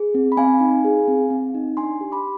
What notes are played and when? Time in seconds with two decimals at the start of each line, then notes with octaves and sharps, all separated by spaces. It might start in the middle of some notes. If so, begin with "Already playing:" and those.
Already playing: G#4
0.14 C4
0.32 B5
0.37 C4 F5 G#5
0.60 D#4
0.84 G#4
1.08 C4
1.30 C4
1.54 D#4
1.77 D4 G#5 C6
2.01 G4
2.12 B5 D6